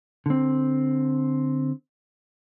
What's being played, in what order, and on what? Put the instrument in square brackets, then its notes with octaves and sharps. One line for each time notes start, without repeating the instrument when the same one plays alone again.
[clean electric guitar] D3 C4